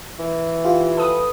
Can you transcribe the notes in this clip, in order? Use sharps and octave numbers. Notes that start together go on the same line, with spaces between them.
E3
F4 G4
A4 B4 D#6